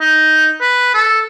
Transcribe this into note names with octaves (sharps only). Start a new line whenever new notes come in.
D#4
B4
A4